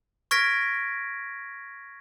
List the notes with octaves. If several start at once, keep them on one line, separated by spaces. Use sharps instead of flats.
C#6 F6 G#6 A#6 B6 D7